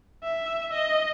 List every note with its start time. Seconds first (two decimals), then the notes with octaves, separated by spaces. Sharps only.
0.23 E5
0.74 D#5